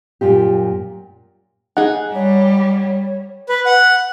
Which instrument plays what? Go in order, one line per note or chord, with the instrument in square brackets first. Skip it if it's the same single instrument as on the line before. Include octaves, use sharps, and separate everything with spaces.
[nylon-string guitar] F#2 A#2 F4 G4
[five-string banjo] D#4 G#4 [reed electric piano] F#5
[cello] G3 [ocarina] C#5
[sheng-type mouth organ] B4
F#5